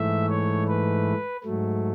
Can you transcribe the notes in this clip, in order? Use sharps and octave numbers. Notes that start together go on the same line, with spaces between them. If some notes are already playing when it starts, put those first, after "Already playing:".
Already playing: G#2 E3 A3 E5
C#5
B4
G#2 F#3 A3